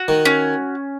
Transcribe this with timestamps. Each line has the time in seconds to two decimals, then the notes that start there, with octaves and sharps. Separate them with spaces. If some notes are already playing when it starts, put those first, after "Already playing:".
Already playing: F#4
0.08 D#3
0.25 C#4